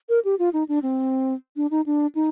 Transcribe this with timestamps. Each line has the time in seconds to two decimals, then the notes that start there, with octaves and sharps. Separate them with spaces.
0.09 A#4
0.25 G4
0.39 F4
0.53 D#4
0.69 D4
0.83 C4
1.56 D4
1.71 D#4
1.86 D4
2.15 D#4